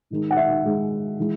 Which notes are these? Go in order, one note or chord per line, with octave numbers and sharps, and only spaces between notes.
G#2 D#3 G#3
F#5
E5
G#2 D#3 G#3
E3 G#3